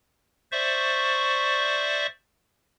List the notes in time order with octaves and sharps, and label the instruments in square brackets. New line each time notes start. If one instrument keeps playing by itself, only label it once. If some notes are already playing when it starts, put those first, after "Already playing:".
[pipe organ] C5 D5 E5 C#6